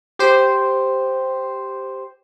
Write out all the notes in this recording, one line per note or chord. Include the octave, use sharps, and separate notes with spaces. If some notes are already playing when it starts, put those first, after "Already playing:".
G4 C5